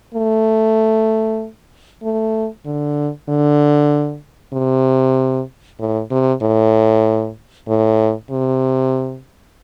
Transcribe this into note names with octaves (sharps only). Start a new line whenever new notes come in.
A3
A3
D3
D3
C3
A2
C3
A2
A2
C3